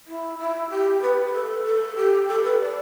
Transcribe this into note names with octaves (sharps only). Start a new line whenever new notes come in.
E4
E4
G4
B4
B4
A4
A4
G4
A4
B4
D5